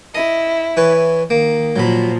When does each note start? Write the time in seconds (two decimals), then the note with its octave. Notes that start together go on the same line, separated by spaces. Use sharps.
0.15 E4 D#5
0.77 E3 B4 C#5
1.30 D#3 A#3
1.76 A#2 F3 F#3 B5